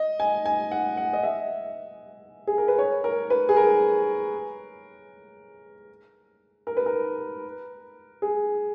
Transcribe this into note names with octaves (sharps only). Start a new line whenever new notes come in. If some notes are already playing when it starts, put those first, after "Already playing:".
Already playing: D#5
G#5
G#5
F#5
F#5
D#5
E5
G#4
A#4
B4
C#5
A#4
B4
G#4
A#4
A#4
B4
A#4
G#4